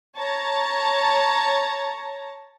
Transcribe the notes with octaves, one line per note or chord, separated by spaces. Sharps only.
C#5 A5 A#5